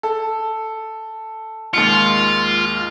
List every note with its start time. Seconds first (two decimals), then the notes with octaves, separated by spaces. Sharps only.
0.03 A4
1.74 D#2 G#2 F4 C#7